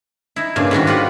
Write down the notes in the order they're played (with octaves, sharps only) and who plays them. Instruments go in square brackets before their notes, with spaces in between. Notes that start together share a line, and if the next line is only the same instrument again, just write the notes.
[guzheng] D#4 E4
G2 A#2 C#3
G#2 D#3 G3 F#4
F4 G4 B4 F#5